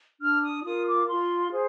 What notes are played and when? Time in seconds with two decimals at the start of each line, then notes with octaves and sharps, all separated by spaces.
0.20 D4 F6
0.42 D#6
0.64 F4 A#4 D#6
0.86 D6
1.08 F4 C6
1.51 G#4 C5